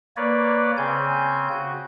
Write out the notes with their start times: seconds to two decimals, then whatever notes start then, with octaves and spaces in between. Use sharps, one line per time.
0.17 A#3 B4 C#5 D5
0.78 C#3 C4 G#5 G6
1.52 F#4